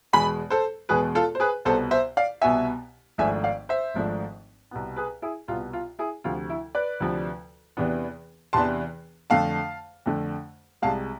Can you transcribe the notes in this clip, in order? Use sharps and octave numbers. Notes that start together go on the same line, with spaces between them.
E2 B2 G#3 G#5 B5
A4 C5
E2 B2 G#3 G#4 B4
F4 A4
C5
G#4 B4
C2 B2 B3 A4 C5
C5 E5
D5 F5
C2 B2 B3 E5 G#5
G#1 G#2 F3 A3 D4 E5 G#5
D5 F5
C5 E5
G#1 G#2 F3 A3 D4
C2 B2 B3
G#4 B4
E4 G#4
C2 B2 B3 F4
F4
E4 G#4
D2 C3 F3 F4
E4
B4 D5
D2 C3 F3
E2 C3 E3 B3 D4
E2 C3 E3 B3 D4 A5 C6
F2 D3 A3 F5 A5
F2 D3 A3
C2 C3 G#3 F5 A5